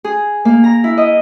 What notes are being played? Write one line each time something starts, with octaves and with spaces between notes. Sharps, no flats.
G#4
A#3
A#5
E4
D#5